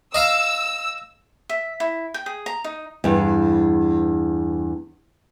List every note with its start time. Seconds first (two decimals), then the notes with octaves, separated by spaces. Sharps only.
0.15 D#5 F5 A#5 E6
1.49 E5
1.80 E4
2.14 G5
2.26 G#4
2.46 A#5
2.64 D#4
3.04 E2 G2